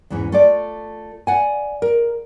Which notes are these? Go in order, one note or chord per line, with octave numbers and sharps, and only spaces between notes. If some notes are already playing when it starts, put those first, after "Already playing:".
E2 G#2 E3 C#4
A3 F4 D5
D5 F#5 G#5
A#4